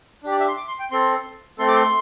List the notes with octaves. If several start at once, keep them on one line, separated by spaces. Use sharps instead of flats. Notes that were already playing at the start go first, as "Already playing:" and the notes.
D4 G4
D5
E5
C6
D6
C6
G5
C4 A4 C6
A3 C4 A4 C6
D6
C6